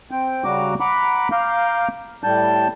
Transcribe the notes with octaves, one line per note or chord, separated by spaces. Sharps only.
C4 G5
C#3 G3 F#4 A#5 D6
F#5 A#5 B5 D6
F5 A#5 D6 G6
A2 G3 A5 G6